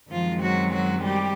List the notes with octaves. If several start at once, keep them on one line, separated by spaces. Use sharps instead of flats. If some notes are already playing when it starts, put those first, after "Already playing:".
F#2 D#3 F3 G#3 C4 F4
F#3 F#4
F#3 F#4
G3 G4